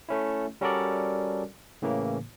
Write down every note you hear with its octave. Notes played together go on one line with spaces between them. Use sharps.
A3 C#4 E4
G3 C#4 F#4 A4 A#4 D5
A2 C#3 E3 A#3